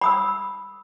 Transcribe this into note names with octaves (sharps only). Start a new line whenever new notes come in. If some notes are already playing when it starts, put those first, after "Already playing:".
B5 D#6 E6